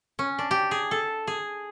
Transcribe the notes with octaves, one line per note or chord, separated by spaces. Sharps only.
C#4
D4
G4
G#4
A4
G#4